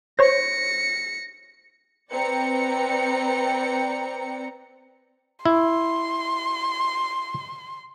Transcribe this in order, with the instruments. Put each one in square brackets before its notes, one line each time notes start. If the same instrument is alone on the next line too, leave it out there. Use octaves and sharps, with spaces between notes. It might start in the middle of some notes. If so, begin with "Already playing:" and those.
[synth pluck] C5 C#5 [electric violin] A#6 C#7
[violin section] C4 B4 D5 G5 A#5 C#7
[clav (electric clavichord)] E4 [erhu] C6